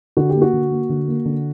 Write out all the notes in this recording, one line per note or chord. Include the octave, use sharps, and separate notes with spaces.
D3 F#4
G4
A#3
F#4
D3
A#3
D3
A#3
D3